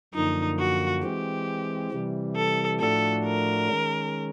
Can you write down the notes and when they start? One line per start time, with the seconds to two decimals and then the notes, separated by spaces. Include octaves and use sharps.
0.14 F#2 D3 F3 A#3 D#4
0.59 F#4
1.03 E3 G#3 C4 G4
1.92 C3 E3 G3
2.36 A4
2.80 A2 F3 A3 D4 F#4 A4
3.25 A#4
3.69 D#3 G#3 C#4